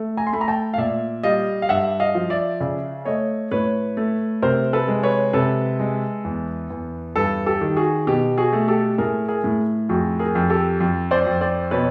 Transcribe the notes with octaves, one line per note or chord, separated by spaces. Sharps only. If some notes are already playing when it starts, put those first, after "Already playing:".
Already playing: A3
G#5 A#5
C6
A3 B5
A#5
G5 A5
F5
A#2 D5 E5
G3 D#5 F5
F5
G2 E5 F#5
D#5 F5
F3
D5 E5
C#3 D5 E5
A3 C#5 D#5
A2 B4 C#5
A3
C3 A#4 C5
A4 B4
G#3
B4 C#5
C3 A4 B4
G#3
E2
E2
G2 A4 B4
G4 A4
D#3
F#4 G#4
B2 G4
F#4 G#4
A3
G4 A4
A2 G#4 A#4
G#4 A#4
A2
F2 F#4 G#4
G#4 A#4
F2
G4 A4
F2
C5 D5
F2
C5 D5
B2 B4 C#5